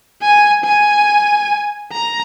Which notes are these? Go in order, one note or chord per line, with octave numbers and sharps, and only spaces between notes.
G#5
G#5
A#5